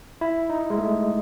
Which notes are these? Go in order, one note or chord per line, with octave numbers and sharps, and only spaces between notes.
E4
D#4
G#3
A3